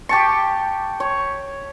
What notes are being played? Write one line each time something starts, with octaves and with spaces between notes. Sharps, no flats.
G4 A5 C#6
C#5